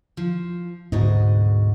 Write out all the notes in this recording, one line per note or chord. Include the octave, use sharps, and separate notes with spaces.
F3
D2 G#2 B2 D#5